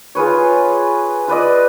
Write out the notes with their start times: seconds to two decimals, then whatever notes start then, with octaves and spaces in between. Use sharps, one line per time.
0.15 F4 G#4 B4 C#5
1.28 F4 B4 D5 D#5